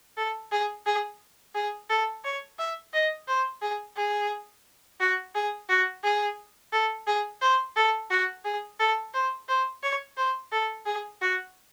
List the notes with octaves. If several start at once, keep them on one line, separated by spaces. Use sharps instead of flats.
A4
G#4
G#4
G#4
A4
C#5
E5
D#5
C5
G#4
G#4
F#4
G#4
F#4
G#4
A4
G#4
C5
A4
F#4
G#4
A4
C5
C5
C#5
C5
A4
G#4
F#4